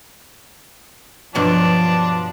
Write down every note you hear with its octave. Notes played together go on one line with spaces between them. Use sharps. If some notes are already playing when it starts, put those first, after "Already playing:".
G2 B2 F3 F#3 D4